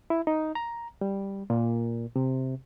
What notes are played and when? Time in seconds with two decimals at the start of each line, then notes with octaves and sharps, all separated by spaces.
0.10 E4
0.27 D#4
0.55 A#5
1.01 G3
1.50 A#2
2.16 C3